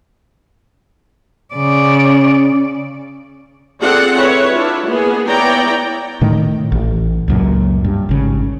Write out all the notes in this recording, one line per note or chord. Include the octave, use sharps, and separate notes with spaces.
C#3 D5
C4 F4 G#4 A4 D5 F#5
E4 B4 C#5
D4 E4 F4
A#3 B3 G#4
B3 E4 C#5 D5 G5 A#5
A2 D#3 A3
A1
C#2 F#2 A#2
G2
G#1 C#3